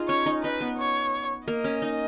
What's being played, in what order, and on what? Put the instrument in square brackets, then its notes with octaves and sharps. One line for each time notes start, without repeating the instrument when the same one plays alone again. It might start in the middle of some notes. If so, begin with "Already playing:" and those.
Already playing: [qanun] D#4 F4 G#4
[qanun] C#4 [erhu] C#5
[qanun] D#4
[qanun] D#4 [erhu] B4
[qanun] B3
[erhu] C#5
[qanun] A#3 [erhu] D#5
[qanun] C#4
D#4